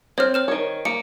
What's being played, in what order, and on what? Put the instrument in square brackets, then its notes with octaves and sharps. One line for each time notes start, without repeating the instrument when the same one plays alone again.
[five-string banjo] C4 [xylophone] C#5 F6
[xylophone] C5 F6 E7
[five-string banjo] D#3 C#5
[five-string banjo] A#3 [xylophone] C#7